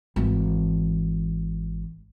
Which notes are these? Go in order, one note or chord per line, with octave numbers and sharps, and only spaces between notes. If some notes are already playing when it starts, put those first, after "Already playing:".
G#1 E3